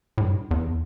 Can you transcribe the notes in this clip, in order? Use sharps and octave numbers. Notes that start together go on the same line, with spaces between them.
A2
G2
E2